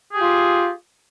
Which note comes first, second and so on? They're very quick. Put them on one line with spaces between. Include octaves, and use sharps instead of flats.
G#4 G4 F4